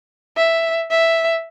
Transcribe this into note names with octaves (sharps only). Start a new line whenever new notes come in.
E5
E5